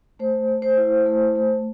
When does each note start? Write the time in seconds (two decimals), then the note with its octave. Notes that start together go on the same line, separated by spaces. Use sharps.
0.19 A3 C5
0.48 A3
0.62 C5
0.77 E4
1.06 A3
1.35 A3